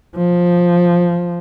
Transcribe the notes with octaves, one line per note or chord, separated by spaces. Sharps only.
F3